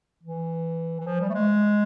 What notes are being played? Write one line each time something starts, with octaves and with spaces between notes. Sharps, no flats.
E3
E3
F3
G3
A3
G#3